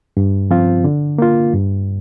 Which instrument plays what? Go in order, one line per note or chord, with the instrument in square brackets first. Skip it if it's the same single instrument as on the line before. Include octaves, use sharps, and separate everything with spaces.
[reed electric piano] G2
F3 C4 F4
D3
A#3 F4
G2